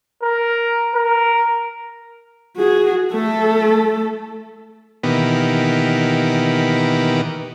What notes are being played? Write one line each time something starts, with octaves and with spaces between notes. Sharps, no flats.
A#4
A#4
F#4 G#4
A3 A4
B2 D#3 E3 A#3 B3 G4